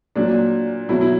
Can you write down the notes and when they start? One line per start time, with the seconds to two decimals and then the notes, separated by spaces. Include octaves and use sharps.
0.15 A#2 F#3 D4
0.89 B2 F#3 E4
1.01 E4